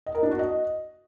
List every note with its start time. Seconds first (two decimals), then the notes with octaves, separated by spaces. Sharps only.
0.06 D#5
0.15 A#4
0.23 D4
0.31 F#4
0.39 D#5